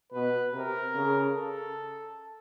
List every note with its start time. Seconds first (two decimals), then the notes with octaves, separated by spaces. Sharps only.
0.12 B2 B4
0.54 C3 A#4
0.94 C#3
1.35 A4